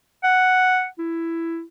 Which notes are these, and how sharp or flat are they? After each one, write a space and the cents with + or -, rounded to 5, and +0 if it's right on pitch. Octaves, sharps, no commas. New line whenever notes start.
F#5 +0
E4 +10